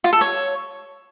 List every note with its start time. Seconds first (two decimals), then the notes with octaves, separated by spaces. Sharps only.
0.04 F4
0.13 A4
0.21 C#5